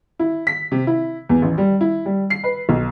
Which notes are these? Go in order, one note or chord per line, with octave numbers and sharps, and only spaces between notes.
E4
B6
C3
E4
E2
A1
G3
E4
G3
C7
B4
B1